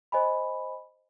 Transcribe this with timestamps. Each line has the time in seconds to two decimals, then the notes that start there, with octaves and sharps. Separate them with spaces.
0.12 C5 D#5 G#5 B5